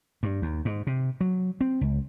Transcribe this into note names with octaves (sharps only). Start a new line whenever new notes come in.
G2
D#2
G#2
C3
F#3
C4
C#2